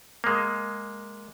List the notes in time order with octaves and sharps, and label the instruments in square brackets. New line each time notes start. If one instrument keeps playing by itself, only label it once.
[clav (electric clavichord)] G#3 A#3